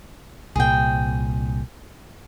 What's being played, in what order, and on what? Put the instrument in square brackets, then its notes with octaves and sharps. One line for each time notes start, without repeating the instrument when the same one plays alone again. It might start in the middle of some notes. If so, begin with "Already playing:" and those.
[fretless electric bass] C2 A#2 [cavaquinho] G#4 G5